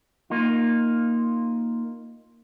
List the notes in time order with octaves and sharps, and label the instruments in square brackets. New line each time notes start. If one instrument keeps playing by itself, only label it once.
[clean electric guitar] A#3 D#4 F4